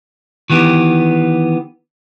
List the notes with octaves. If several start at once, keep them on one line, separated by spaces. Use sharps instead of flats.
D#3 E3 B3 G4